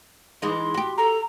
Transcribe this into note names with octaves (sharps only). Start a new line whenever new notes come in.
E3 G#3 D#4 C6
F#4 G4
A4 A#5